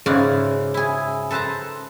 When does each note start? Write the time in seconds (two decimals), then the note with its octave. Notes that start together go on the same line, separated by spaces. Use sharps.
0.06 G#2 C#3 E4 F#4 D5 F5
0.74 E4 G#4
1.31 A4 B4 C5 A5 A#5